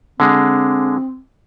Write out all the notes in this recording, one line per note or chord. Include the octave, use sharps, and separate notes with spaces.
D3 G#3 C4